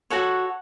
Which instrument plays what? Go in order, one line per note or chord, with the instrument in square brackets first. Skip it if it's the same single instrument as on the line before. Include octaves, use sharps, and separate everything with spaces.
[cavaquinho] F#4 A4 C#5 F#5